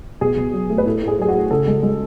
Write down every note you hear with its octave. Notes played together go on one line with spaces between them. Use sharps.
B2 G#4
B2
F#3
A3
B4
A2 A4
A2
G#4
F#3 G#4
F#4
A3
C#3 A4
G#3
G#3